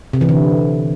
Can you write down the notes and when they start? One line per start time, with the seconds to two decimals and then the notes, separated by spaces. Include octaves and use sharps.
0.13 C3
0.21 E3
0.29 D3